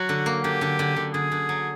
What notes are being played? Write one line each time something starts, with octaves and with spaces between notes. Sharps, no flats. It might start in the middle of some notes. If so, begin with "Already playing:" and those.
Already playing: F#3 F#4
D3
A#3
D3 G4
D3
D3
D3
D3 G#4
D3
F#3